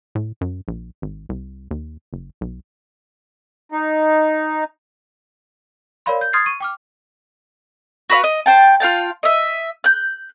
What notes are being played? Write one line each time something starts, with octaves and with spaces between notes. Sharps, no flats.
A2
F#2
A#1
G#1
C2
D#2
F#1
B1
D#4
A#4 C#5 D5 F5 B5 C6
G6
C6 D#6 F6 G#6 A6 C7
C#6 D#7
G5 D6 F6
F#4 B4 D#5 F5
D#5
C5 G5 A5
F4 F5 G5 A5
D#5 E5
F#6 G6